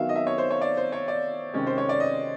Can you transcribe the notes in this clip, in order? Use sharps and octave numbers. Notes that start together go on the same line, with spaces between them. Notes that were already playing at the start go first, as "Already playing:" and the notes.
Already playing: D#3 F#3 B3 D#4 E5 F5
D#5
E5
C#5
C5
C#5
D5
C5
C#5
D5
C3 D#3 G#3 C#4
C5
C#5
D5
D#5